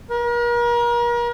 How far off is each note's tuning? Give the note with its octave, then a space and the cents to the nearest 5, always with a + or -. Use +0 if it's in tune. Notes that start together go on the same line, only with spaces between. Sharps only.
A#4 +40